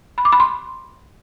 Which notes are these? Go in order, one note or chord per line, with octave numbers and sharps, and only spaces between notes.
B5
D6
B5
C6